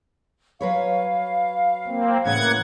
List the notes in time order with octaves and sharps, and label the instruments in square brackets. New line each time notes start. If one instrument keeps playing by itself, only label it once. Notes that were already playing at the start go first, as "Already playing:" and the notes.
[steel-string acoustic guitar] F#3 B4 C#5 [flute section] F5
[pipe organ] A#3 C4
[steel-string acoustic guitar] A2 C#3 E3 [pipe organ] A#3 F#5 G#6